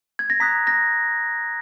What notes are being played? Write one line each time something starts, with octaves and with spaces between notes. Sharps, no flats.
G#6
A#6
A#5 D#6 F#6 B6
A#6